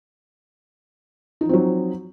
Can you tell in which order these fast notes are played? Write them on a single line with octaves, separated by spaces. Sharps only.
D#4 F3 C4 F#3